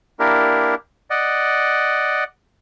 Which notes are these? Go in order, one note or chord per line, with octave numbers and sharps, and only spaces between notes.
A#3 D4 E4 G4 A#4
D5 D#5 F#5